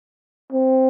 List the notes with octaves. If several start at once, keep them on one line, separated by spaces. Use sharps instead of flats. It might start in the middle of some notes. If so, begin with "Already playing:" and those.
C4